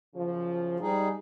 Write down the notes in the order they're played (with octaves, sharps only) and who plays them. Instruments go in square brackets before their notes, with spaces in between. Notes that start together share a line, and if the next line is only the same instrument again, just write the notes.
[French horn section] F#2 C#3 F3
[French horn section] G#2 [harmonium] G3 D#4 G#4